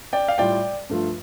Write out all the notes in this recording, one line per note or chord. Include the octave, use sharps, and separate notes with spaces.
D5 G5
F5
A2 G3 F4 D5 G5
G2 F3 A3 F4